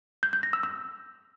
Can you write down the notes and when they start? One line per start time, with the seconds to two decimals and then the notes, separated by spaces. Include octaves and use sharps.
0.23 G6
0.33 G6
0.43 A#6
0.53 E6
0.63 E6